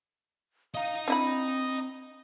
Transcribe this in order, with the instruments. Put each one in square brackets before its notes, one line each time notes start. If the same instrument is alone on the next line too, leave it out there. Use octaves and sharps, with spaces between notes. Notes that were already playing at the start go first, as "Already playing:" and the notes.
[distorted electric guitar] D#5 A#5 [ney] F5
[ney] C4 [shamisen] D4 E4 B5